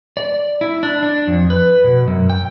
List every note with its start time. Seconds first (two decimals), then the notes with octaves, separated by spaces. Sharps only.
0.17 D5
0.61 E4
0.83 D4
1.03 D4
1.27 F2
1.50 B4
1.84 B2
2.07 F#2
2.30 G5